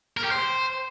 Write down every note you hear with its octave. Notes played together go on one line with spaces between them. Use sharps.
A#4
G4
C5